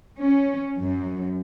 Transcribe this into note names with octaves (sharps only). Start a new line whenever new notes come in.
C#4
F#2